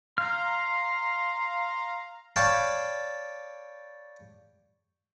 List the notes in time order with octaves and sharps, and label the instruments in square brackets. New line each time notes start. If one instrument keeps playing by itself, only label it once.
[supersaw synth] F5 A#5 [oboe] C6 [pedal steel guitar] F6
[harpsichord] C#5 D5 F5 G5 A5 B5